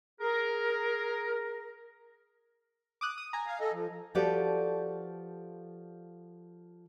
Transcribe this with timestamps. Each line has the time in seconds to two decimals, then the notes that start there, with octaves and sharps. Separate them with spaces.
0.21 G#4 A#4
3.01 D6 D#6 F#6
3.18 D#6
3.33 G#5 A#5
3.46 F5
3.60 A4 D#5
3.73 F3
4.15 F3 F#4 G4 A4 B4 D5